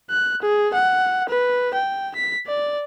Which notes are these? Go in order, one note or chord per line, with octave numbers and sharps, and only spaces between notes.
F#6
G#4
F#5
B4
G5
B6
D5